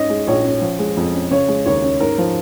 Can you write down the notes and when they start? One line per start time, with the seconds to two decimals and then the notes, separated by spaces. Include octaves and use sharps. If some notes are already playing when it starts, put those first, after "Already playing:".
Already playing: G#2 C#4 D#5
0.10 G#3
0.27 A#1 C#5
0.45 C#4
0.62 F3
0.79 G#3
0.97 F2
1.14 C#4
1.31 C#3 C#5
1.48 G#3
1.66 D#2 C#5
1.84 C#4
2.00 G#2 A#4
2.18 F3